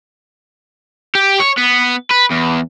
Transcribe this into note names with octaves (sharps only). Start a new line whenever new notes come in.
G4
C#5
B3
B4
E2